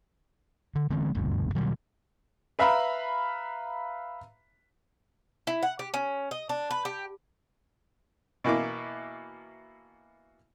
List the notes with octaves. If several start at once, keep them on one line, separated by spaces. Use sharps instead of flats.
D3
D3 E3 G#3 C4
F#1 D2 G2 B2
B2 D#3 F#3 G3
B4 E5 F5 A#5 B5
E4
F#5
G4
C#4
D#5
D4
B4
G4
B2 E3 A#3 E4 D6